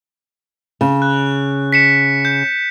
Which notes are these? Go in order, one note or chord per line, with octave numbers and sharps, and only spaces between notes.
C#3
F#6
B6 C#7 E7
G6